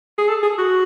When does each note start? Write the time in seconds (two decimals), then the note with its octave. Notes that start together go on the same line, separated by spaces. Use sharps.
0.18 G#4
0.29 A4
0.43 G#4
0.58 F#4